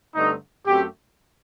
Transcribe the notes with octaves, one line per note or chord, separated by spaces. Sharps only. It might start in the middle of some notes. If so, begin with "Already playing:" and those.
G2 D3 A3 C4 D#4
F#2 F#3 A3 C4 G4